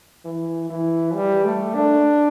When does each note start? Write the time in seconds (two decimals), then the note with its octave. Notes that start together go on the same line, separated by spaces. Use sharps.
0.25 E3
0.70 E3
1.14 G3
1.45 A3
1.74 D4